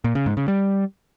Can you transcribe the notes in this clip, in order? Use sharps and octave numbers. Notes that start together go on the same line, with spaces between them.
A#2
C#3
G#2
C#3
G3